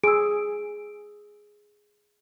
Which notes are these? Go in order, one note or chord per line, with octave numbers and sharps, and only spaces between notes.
G#4 E6 D7